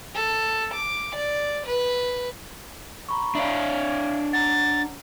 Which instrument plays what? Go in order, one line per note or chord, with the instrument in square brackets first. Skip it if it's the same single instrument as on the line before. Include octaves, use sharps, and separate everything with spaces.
[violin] A4
D6
D5
B4
[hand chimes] A#5 B5 C#6
[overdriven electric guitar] D4 C#5 [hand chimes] E5 F5
[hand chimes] F#5 A#5 [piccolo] A6